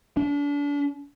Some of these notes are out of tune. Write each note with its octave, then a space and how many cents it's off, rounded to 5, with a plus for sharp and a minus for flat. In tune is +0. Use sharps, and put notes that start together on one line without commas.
D4 -35